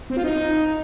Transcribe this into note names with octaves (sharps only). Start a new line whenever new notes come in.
C4
F4
D#4